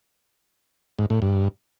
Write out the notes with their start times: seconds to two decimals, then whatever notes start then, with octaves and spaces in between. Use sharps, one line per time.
0.99 G#2
1.10 A2
1.22 G2